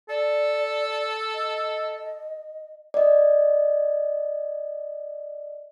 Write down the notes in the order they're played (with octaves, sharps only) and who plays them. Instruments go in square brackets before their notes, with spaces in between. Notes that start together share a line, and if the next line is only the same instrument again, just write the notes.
[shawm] A4 [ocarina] D5
[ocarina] D#5
[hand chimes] D5 D#5